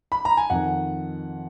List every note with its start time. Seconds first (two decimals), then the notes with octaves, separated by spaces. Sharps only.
0.12 B5
0.25 A#5
0.37 G#5
0.50 F2 D#3 F#5